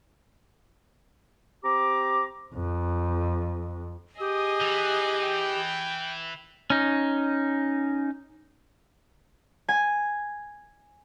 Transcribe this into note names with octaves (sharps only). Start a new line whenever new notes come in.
C4 G4 A#5 D6
F2
G4 G#4 D#5 D#6
E3
G5
C#4 D#4
G#5